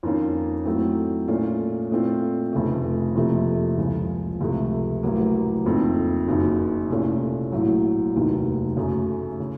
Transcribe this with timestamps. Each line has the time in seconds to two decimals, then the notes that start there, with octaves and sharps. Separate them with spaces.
0.03 F2 D#3 A#3 C#4 F4
0.65 A2 F#3 A3 C4
1.28 A#2 A3 C#4 F4
1.91 A#2 A3 C4 F4
2.53 F1 F2 C#3 A3
3.16 F#1 F2 C3 F3 A3
3.78 C#2 C#3 F3
4.40 C#2 C3 F3 A3
5.03 A1 A2 F#3 A#3
5.65 F#1 F2 D#3 A3 C4
6.28 F#1 F#2 D#3
6.90 C2 A#2 A3 C#4 F4
7.52 A#1 A2 F#3
8.14 F1 D#2 D#3 F#3
8.77 F#2 C#3 A3
9.40 C#3